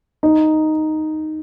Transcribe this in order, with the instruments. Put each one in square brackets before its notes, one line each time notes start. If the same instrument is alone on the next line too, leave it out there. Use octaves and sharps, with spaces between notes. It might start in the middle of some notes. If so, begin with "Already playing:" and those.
[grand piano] D#4